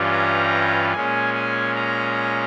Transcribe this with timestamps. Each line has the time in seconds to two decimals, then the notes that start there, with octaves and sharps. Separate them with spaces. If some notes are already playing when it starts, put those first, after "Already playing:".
Already playing: G2 E3 G3 C#4 F4
0.12 A#5
0.93 A#2 G#3 C#4 G#5
1.34 G#5
1.75 A#5